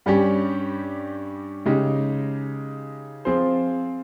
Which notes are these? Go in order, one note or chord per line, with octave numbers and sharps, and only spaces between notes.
G2 G3 C#4 G4
C#3 G#3 D#4 G4
F3 C4 F4 G#4 C5